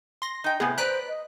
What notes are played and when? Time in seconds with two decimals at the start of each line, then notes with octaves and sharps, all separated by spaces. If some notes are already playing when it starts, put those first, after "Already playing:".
0.22 C6 A#6
0.44 D#4 D#5 G5
0.60 A2 C3 B3 G#4 G#5
0.78 B4 C5 D5 A#5 F#6 B6 D7
1.08 D#5